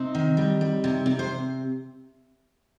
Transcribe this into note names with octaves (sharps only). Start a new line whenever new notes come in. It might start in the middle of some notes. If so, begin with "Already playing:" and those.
Already playing: C3 C4 D#4
D#3
G3
G3
C3
C3
C5